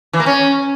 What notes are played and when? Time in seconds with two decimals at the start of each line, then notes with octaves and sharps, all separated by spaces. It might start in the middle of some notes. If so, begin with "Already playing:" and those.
0.13 E3
0.20 A#3
0.26 C#4